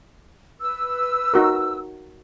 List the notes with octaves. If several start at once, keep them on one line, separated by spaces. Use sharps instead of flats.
B4 E6
D#4 F#4 A#4